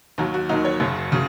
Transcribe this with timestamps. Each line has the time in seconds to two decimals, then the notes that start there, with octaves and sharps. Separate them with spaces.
0.18 D#2 D#3 F#3 A#3
0.34 F#4
0.49 D#2 D#3 F#3 D#4
0.65 C#5
0.80 F#1 F#2 C#3 F#3
1.12 C#3 F#3